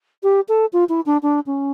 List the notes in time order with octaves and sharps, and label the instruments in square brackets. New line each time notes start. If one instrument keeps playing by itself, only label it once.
[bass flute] G4
A4
F4
E4
D4
D4
C#4